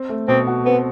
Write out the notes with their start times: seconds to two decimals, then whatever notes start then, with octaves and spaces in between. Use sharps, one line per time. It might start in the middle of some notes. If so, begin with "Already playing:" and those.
Already playing: C4
0.09 A3
0.28 B2 C4
0.47 F#4
0.66 B3 C4